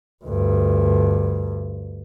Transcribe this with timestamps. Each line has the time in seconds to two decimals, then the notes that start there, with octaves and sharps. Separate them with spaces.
0.25 D2 G2